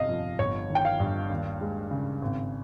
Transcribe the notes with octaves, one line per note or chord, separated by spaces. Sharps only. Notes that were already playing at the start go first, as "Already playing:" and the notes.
Already playing: G1 C3 D#5 F5
F2
G1 C#5
D#3
G5
F5
G2
D#2
G#3
C#3
G#1